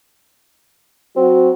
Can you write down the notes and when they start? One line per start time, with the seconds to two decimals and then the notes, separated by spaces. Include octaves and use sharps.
1.16 F#3 C4 F#4